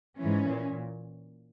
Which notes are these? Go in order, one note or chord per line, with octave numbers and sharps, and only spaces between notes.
G#2 E3 C#4
A#2